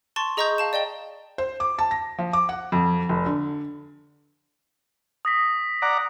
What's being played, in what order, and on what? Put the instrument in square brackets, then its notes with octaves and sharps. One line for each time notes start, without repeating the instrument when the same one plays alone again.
[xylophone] A5 C6 C#6 A6
G#4 D#5 A#5 C#6 D#6 G6
F5 A5 E7
D5 D#5 G5 G7
[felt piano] C5
D6
A5
A#6
F3
D6
F#5
F2
F1
D3
[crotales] D#6 A#6 B6
[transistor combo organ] D5 F#5 A#5